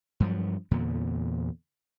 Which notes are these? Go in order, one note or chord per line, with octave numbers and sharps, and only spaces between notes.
G2 F3 F#3
E2 A#2 D3